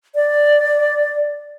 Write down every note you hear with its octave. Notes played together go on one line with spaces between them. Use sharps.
D5